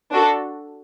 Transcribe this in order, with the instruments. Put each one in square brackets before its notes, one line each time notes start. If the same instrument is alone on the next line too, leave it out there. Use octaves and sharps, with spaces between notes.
[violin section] D4 F#4 A4